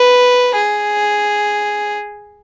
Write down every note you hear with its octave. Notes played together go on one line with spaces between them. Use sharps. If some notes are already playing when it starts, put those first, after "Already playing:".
Already playing: B4
G#4